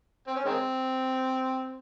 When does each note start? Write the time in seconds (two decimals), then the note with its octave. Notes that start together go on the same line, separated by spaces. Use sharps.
0.27 C4
0.36 C#4
0.45 D#3 G#3 C4